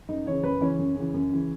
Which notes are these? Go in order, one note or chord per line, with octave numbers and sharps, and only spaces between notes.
F#2 D#4
C#3 E3 C#5
F#2 B4
C#3 E3 C#4
F#2
C#3 E3
F#2
C#3 E3